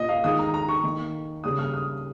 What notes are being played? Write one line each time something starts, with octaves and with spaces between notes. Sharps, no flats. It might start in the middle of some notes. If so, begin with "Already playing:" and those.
Already playing: A#2 A#3 D#5
F5
D#3 G#3 D#6
A#5
A#5
C#6
D#3 A#3
C#3 G3 A#3 D#6
F6
D#6